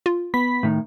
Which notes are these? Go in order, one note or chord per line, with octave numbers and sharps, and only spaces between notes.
F4
B3 B5 B6
A2 D#3